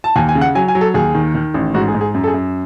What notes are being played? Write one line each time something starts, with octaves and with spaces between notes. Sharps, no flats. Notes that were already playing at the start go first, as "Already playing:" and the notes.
A5
D#2 G#5
G#5
C#3
F#5
F#3 G#5
G#5
F#3
A4
D#2 G#4
D#3
D#3
A1
G#2 F#4
G#4
G#2
G#4
F#2
A4
G#4
F#2